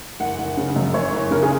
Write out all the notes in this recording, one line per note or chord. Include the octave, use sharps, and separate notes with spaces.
F#1 F#5
F#1
C#3
F#2
F#1 C#5
F#1
C#3 A#4
G#4